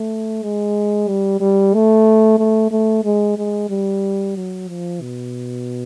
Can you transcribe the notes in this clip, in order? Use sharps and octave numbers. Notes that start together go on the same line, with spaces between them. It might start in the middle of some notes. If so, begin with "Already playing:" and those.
Already playing: A3
G#3
G3
G3
A3
A3
A3
G#3
G#3
G3
F#3
F3
B2